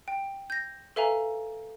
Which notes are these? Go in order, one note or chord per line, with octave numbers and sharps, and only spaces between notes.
G5
G6 A#6
A4 B4 E5 F5 G#5 A#5